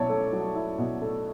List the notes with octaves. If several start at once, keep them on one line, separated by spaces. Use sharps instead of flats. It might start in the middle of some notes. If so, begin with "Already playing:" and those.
Already playing: B2 F#3 E4 C#5 D5 A5
A3
F#3
E4
B2
A3